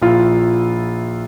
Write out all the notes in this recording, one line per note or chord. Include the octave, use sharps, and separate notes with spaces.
A#1 E4 F4